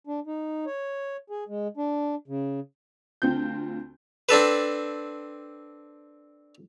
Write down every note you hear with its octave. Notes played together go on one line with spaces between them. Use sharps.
D4
D#4
C#5
G#4
G#3
D4
C#3
D2 C4 F4 G6
C4 D4 A4 B4